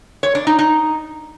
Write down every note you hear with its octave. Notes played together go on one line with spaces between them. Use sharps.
C#5
D4
D#4
D#4